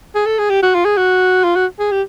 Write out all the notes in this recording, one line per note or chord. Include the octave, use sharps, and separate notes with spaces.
G#4
A4
G#4
G4
F#4
F4
G#4
F#4
F4
F#4
G#4
G4